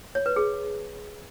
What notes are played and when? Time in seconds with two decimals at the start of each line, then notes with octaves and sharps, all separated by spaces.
0.15 C#5
0.26 B4
0.36 G#4